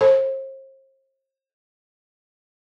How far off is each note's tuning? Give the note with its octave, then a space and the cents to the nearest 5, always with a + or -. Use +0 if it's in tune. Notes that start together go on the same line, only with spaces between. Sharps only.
A4 +0 C5 +40